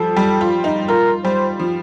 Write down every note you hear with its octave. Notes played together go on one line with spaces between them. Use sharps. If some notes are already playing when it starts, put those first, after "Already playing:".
Already playing: F3 G3 A4
G3
F4
D#4
F4 A#4
G3 C5
F3